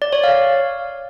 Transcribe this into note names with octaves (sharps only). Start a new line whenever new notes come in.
D5
C#5
F5